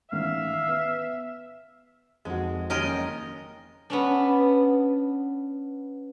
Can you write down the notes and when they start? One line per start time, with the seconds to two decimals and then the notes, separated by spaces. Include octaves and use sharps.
0.12 A1 D#3 E5 F5
0.67 B3
2.25 G#1 F2 G#3 F#4
2.70 D#2 D#3 G#3 C#4 A#4 D#5 G5
2.83 F#1
3.90 B3 C#4 D4